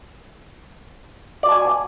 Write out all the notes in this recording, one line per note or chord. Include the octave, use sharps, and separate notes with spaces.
F#4 D5 G#5 A5